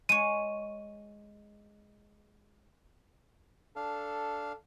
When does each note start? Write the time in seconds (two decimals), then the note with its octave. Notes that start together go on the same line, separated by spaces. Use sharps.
0.09 G#3 C#5 D#7
3.76 D4 A4 F5